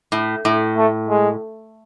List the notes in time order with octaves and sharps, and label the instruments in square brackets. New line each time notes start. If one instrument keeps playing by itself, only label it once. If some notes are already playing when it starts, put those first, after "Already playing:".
[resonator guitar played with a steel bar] A2
A2
[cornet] A3
G#3